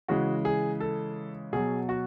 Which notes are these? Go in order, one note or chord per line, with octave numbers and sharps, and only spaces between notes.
C#3 E3 G#3 F#4
G#4
A4
B2 F#3 G#4
F#4